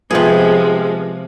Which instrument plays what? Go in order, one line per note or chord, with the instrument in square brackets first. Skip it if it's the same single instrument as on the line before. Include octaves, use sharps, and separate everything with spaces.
[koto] C3 G#4 [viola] F3 G#3 [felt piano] B3 F4 G4